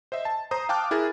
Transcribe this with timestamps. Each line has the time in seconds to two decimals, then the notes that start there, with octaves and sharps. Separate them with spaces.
0.12 C5 D#5 E5
0.25 A5
0.51 C5 A#5 D#6
0.69 F5 G5 A5 D6 F6 F#6
0.91 E4 G#4 A#4 A6